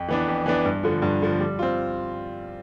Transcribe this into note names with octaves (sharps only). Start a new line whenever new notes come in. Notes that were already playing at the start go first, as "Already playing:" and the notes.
Already playing: F2
E3 B3 D4
F2
E3 B3 D4
G2
D3 F3
G2
D3 F3
G3
C4 F4